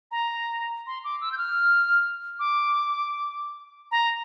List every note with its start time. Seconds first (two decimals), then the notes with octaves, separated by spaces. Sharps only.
0.11 A#5
0.87 C6
1.04 D6
1.21 E6
1.32 G6
1.38 F6
2.39 D6
3.91 A#5